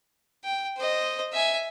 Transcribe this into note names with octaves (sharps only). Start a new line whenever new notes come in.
G5
C5 D#5
E5 G#5